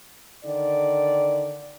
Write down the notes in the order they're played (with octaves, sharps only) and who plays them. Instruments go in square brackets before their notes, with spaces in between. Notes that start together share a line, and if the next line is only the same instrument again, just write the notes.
[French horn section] D3 D#3 D5